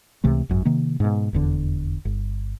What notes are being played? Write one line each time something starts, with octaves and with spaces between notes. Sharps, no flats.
C#2 C3 E3 A3
G#1 F#2
C3 D#3 A#3
G#2 B2
F1 E2 D3
G1